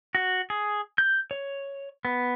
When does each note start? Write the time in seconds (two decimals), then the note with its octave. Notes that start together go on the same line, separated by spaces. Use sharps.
0.15 F#4
0.50 G#4
0.98 G6
1.31 C#5
2.05 B3